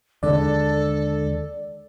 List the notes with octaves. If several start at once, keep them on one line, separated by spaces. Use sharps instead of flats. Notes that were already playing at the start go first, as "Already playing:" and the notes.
D#2 D3 G#3 A4 D5